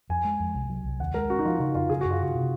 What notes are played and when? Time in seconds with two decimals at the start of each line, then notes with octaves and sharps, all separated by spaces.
0.10 F2 G#5
0.25 G#3
0.40 F2
0.54 C2
0.70 F#3
0.85 C2
1.00 D#2 F#5
1.14 G#3 A#4
1.30 C#4 F#4
1.39 D#4
1.45 F3 F4
1.56 D#4
1.60 C#3 F4
1.75 F2 F4
1.90 C#3 G#4
2.01 F#2 F#4
2.11 F4
2.20 C#3 F#4
2.35 C3